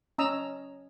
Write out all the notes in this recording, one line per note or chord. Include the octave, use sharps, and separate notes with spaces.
C#4 D#5 A#5 D#6 E6